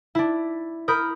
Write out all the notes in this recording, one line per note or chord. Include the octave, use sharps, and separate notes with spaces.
D4 E4
A#4 B5 D#6 G6